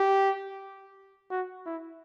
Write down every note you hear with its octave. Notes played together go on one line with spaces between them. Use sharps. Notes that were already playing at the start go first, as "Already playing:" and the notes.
Already playing: G4
F#4
E4